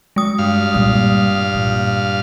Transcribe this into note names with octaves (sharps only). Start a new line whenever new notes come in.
G#3 D#6
G2 F5
A#2 G3
A#2